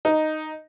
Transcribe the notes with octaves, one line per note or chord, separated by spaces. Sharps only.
D#4